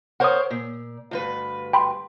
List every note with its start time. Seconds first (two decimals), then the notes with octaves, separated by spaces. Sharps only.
0.20 A#4 C5 C#5 F#5 D#6
0.50 A#2
1.11 D2 G2 B4
1.73 G5 B5 C6